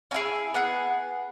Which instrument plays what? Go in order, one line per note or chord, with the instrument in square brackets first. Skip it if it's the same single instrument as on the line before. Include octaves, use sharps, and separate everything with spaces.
[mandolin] C#4 E4 G#4 G#5
B3 G#4 F#5